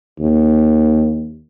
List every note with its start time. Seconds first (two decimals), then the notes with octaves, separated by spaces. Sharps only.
0.20 D#2